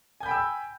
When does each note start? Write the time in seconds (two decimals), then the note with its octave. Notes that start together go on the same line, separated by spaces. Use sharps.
0.20 G#5
0.23 G6
0.26 B5
0.28 G5
0.31 E6